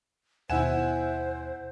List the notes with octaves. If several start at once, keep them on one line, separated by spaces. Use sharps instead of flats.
D#2 B2 E4 C5 E5 F#5 G#5 E7